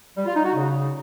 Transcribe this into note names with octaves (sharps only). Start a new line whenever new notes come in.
G3
F4
D#4
F#4
C#3